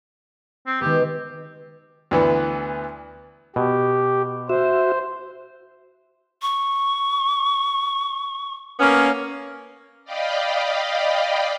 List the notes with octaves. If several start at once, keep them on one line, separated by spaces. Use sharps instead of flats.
C4
D#3 G#3 B3 G4
D2 E3 B3
B2 G4
F#4 C5 E5
C#6
A#3 B3 C#4
D5 D#5 F5 G5 B5